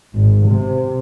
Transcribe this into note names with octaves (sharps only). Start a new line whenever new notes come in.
G#1
C3